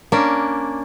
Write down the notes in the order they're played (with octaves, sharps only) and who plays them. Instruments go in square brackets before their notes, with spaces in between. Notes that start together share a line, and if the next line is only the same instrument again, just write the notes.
[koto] A#3 C#4 D4